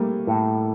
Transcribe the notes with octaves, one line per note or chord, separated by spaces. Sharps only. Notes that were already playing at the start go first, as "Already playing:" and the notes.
Already playing: G3 A3 A#3
A2